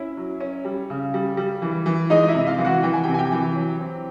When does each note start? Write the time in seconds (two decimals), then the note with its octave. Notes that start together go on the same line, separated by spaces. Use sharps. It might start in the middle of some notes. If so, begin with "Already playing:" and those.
Already playing: C#4 E4 E5
0.17 F#3
0.40 C#4
0.65 G3
0.90 C#3
1.14 G3
1.37 G3
1.62 E3
1.86 E3
2.10 G#3 D#4 D#5
2.28 E4 E5
2.35 C3
2.47 F4 F5
2.58 E3
2.65 F#4 F#5
2.83 E3 G5
2.93 G#5
3.04 C3 G4 G5
3.14 G#5
3.19 G4 G5
3.32 E3
3.55 F#3
3.80 C4